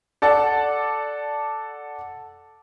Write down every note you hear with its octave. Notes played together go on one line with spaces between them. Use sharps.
A4 D5 F#5 A5